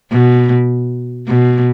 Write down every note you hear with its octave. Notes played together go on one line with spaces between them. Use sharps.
B2
B2